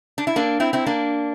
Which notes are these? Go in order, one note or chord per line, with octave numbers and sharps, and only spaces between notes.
D4
E4
A#3 D4
C4 E4
C4 E4
A#3 D4